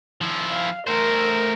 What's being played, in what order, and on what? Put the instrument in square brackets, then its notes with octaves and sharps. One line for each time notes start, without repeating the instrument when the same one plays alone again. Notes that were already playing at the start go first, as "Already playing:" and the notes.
[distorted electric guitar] F3 E4
[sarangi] F5
[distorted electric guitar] A3 C5 [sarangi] A#4